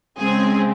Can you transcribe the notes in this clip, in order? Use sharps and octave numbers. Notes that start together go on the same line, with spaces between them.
C#3 G#3 C4 G#4